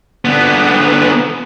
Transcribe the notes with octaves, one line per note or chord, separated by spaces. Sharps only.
D3 B3